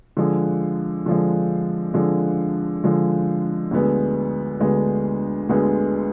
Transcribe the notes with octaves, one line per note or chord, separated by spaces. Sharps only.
D3 F3 G#3
D3 F3 G#3
D3 F3 G#3
D3 F3 G#3
D2 D3 G#3 B3
D2 D3 G#3 B3
D2 D3 G#3 B3